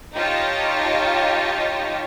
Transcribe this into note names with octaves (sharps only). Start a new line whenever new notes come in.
D#4 F4 G4 C#5 D#5 A5